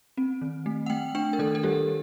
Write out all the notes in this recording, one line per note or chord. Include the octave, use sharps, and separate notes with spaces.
C4
D#3
A3
F#5
A3 G5
D4 G5
A#4
D#3 A4
A4
G3 G4